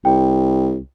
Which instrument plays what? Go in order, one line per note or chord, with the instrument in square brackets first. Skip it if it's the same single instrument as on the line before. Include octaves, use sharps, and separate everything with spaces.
[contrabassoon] C2 [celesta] G5